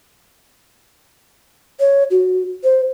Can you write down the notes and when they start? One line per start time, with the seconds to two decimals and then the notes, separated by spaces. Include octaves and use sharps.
1.80 C#5
2.11 F#4
2.64 C5